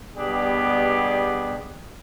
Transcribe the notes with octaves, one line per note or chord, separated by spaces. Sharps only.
B2 G3 B3 D4 G4 G#4